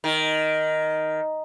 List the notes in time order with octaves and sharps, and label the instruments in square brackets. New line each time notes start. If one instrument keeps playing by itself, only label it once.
[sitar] D#3